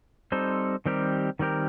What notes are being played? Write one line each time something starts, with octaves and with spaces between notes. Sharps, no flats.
G3 C4 D#4 A4 C5
D#3 G3 C4 G4 A#4
D#3 G3 C4 G4 A#4